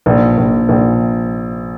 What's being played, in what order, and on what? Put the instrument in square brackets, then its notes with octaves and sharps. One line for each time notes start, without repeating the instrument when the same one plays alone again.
[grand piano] A#1
A#1
A#1